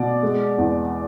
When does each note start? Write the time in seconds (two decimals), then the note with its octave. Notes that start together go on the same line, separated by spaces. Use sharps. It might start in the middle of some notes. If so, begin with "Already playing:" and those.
Already playing: B2 D5
0.23 G#3
0.58 E2